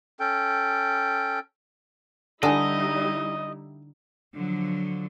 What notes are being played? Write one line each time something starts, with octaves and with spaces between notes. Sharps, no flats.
C#4 A4 G5
D3 G3 D#4 E4 A4 D#5 G#5
D3 F3 F#3